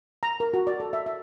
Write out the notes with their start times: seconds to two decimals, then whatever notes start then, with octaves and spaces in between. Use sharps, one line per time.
0.23 A#5
0.40 A#4
0.54 F#4
0.67 D5
0.80 A4
0.93 E5
1.06 E5